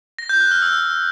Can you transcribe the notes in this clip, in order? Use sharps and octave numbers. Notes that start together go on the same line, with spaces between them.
A#6
G6
F#6
F6
E6